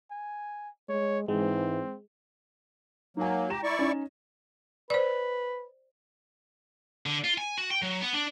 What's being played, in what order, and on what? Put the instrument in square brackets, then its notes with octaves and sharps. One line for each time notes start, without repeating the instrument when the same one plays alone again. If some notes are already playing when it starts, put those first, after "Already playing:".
[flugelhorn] G#5
[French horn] G#3 [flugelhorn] C#5
[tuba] G#2 [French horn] E3 [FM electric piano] G#3 [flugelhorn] C4
[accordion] F#3 A#3 [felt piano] D#4 G#5
[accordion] G4 [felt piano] A#5 A#6 E7
[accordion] E4 D5 C#6
[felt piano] C#4 D#4
[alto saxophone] B4 [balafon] C5 D5
[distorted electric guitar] D3
F4
G#5
F#4
G5
F#3
B3
D4